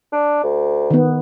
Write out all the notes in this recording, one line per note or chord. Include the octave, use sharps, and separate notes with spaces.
D4
D2
D#3 B3